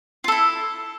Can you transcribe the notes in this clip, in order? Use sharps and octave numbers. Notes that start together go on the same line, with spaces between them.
E4 F4 A4